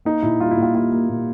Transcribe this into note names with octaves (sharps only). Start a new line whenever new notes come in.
A#3 D#4
A#2 E4
G3 F4
E4
A#2 F4
A#3 F4
A#3
A#2